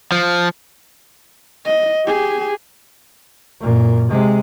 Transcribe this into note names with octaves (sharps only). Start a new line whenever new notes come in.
F3
D#5
G4 G#4
F#2 A#2
C3 G#3